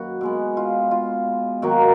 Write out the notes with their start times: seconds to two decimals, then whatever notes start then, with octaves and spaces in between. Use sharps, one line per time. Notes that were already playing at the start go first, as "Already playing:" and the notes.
Already playing: F#2 D#3 F#3 A#3 F#4 B4
0.21 B2 G#3 B3
0.57 F4
0.91 F4
1.62 D#3 F#3 A#3 F#4